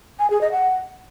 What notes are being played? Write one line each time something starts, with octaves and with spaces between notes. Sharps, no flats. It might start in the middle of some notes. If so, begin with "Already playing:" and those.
G#5
G#4
D#5
F#5